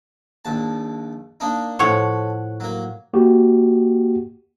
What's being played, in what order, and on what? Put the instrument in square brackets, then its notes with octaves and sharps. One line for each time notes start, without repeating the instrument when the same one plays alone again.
[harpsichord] A#1 D#2 A5
A#3 D4 D#4
[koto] A2 F3 C#5 [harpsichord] A4 [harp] F#5 C#6
[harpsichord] F#3 A#3
[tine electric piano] A#3 F#4 G4